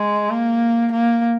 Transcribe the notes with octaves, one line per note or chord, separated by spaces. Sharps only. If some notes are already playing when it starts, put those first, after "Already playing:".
Already playing: G#3
A#3
A#3